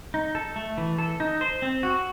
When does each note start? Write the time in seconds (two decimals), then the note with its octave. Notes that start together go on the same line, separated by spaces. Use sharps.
0.14 D#4
0.35 A4
0.56 A3
0.78 E3
0.98 A4
1.20 D#4
1.41 C5
1.62 C4
1.83 F#4